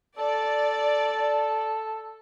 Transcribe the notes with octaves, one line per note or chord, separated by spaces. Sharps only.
A4 D5